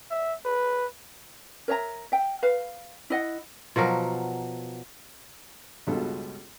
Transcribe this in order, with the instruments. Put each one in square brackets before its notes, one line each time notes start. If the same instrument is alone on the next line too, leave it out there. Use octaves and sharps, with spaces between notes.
[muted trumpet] E5
B4
[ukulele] A#4 C#5 E5 A#5
E5 G5
B4 F5
E4 D#5 F#5
[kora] B2 F3 F#3 A#4
[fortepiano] C#2 G2 B2 F4 A4